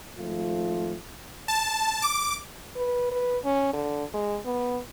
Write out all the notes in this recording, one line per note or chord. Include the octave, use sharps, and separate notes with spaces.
G#1 F3 A3 F4
A5
D6
B4
B4
C#4
D3
G#3
B3